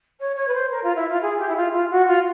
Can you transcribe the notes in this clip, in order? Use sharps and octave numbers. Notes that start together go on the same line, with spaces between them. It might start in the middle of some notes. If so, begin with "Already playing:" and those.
C#5
C#5
B4
C5
A#4
F4
E4
F4
G#4
G4
E4
F4
F4
F#4
F4